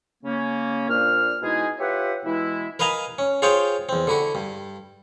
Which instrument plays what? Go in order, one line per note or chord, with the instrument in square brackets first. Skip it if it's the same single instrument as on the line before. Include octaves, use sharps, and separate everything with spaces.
[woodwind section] C#3 A#3 C#4
A#2 D4 C5 F6
B2 G#3 D#4 E4 G#4
F4 G4 B4 C#5 E5 F#5
B2 E3 G#3 E4
[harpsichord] A#4 B4 D#5 F5 G#5 A#5
C#4
F4 G#4 C5 C#5 F5 G5
E2 C4
D3 E4 F#4
G2